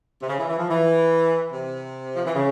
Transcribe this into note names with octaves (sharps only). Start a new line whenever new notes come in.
C3
C#3
E3
E3
F3
E3
C3
F3
E3
C#3